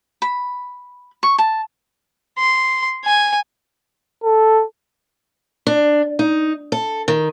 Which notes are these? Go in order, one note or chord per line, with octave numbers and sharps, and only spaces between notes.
B5
C#6
A5
C6
G#5
A4
D4
D#4
A4
D#3